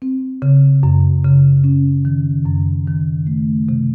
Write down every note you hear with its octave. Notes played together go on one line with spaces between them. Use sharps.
C4
C#3
F#2
C#3
C#4
D#3
F#2
D#3
A3
C3